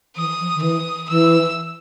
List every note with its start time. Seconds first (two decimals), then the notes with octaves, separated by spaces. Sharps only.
0.16 E3 D#6
0.40 F3
0.55 D#3
0.62 E3 D#6
1.09 E3 E6